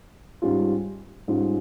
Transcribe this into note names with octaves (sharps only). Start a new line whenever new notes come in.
G#2 G3 C#4 F4
G#2 G3 C#4 F4